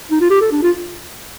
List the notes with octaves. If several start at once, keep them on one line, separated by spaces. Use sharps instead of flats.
D#4
F4
G4
A4
D4
F4